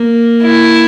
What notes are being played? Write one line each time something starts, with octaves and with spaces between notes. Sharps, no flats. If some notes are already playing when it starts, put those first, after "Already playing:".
Already playing: A#3
E4